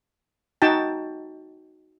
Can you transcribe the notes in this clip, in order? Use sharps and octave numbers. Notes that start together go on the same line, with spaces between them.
D#4 F#4 G5 A5